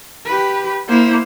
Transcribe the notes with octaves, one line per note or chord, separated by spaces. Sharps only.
G4 B4
A#3 E4 C5